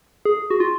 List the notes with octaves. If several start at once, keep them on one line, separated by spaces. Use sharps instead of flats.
G#4
F#4
F4